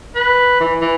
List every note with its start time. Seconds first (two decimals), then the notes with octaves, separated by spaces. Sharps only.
0.15 B4
0.60 E3
0.81 E3